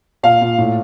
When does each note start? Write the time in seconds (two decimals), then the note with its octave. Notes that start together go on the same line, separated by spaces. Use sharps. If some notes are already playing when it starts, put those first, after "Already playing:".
0.23 A#2 F5
0.41 A#2
0.58 A2